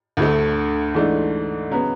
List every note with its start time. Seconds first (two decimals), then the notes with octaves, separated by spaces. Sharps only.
0.17 D2 D3 A3
0.94 G#2 E3 A3 D4
1.70 C#3 F#3 B3